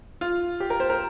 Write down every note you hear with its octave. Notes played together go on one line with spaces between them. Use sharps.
F4
G4
A#4
C5
A#4